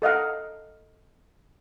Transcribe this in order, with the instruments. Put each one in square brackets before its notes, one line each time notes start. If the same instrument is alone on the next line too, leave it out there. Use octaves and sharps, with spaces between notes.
[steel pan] A4 D#5 F5 F#5